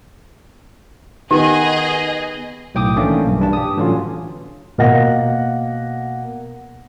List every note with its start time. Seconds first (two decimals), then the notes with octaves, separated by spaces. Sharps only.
1.31 D#3 B3 G4 G#4 D#5
2.75 B1 A2 G5 D6 D#6
2.96 D#3 E3 A3 A#3 C#4 D4
3.26 B1 G2
3.40 G2 D4 A5
3.53 G4 D#6
3.77 A2 D3 E3 F#3 C#4 F4
4.78 B2 A#3 D#5 F#5 A#6